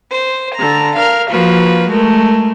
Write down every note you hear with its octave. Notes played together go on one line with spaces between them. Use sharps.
C5
D3 A#5
A#4 F5
F3 A#3 F#4 B4
G#3 A3 A#4